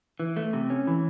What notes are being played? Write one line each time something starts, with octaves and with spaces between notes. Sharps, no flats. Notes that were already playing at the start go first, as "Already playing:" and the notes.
E3
A3
C3
C#4
E3